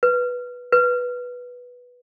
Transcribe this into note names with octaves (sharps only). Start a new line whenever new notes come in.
B4
B4